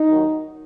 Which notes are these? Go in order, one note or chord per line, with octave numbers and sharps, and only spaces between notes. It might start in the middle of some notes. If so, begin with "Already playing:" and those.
Already playing: D#4
D#2 D#3 F#3